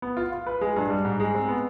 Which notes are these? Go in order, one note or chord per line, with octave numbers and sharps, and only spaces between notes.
B3
F4
F4
B4
G#3
G2
G3
G#2
G#3
C4
B3